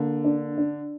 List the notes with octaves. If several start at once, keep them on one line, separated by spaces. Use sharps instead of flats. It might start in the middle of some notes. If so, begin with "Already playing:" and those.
Already playing: D3 A#3
D4
D4